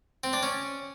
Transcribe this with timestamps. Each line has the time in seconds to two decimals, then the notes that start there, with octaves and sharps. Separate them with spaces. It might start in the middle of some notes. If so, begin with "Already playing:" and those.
0.24 C4
0.33 D4
0.43 C#4